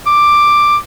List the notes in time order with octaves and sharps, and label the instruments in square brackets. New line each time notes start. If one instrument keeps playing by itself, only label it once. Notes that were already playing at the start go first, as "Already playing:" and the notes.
[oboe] D6